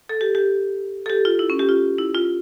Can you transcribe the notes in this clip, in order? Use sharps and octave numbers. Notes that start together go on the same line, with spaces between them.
A4
G4
G4
A4
G4
F4
E4
C#4
G4
F4
E4
F4